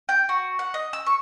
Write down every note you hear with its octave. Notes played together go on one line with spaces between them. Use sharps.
G5
F#4
F#5
D#5
E6
C#6